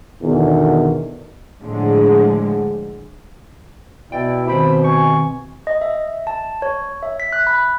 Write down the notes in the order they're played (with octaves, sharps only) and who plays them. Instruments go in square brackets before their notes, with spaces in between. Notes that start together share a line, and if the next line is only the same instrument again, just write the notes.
[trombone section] E2 B2 D3 D#3
[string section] A2 D3 F3 G#3
[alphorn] B2 [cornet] E4 [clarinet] D5 [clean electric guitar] G5
[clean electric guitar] D#3 C4 G4 [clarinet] C5 [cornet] B5
[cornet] G#5 [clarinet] C#6
[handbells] D#5
E5
A5
C#5
E5
B6
F#6
B5